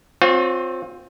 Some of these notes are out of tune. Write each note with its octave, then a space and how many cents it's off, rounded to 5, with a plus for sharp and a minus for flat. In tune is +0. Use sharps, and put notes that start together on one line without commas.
C4 +0 F4 +35 C#5 +0